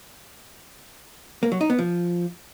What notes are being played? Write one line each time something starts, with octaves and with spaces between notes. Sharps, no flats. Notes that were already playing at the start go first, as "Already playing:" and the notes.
A#3
F#3
D#4
B3
F3